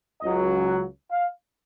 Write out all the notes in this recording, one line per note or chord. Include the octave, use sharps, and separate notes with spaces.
C#2 C#3 F#3 D#5
F#5
F5